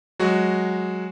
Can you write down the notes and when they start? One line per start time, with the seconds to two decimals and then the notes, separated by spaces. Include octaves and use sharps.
0.19 F#3 G#3 F#4